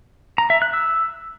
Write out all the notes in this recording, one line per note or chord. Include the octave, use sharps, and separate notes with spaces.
A#5
E5
F#6
E6